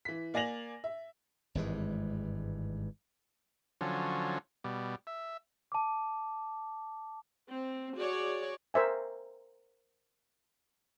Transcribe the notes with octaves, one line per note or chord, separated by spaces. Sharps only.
E3 B6
A#3 D5 G#5 A#6 F7 F#7
E5
G#1 G2 E3 G#3
D3 F3 F#3 C#4
B2 G3
E5
A5 D6
C4
F#4 G#4 C#5 D5
A#4 C5 E5 G#5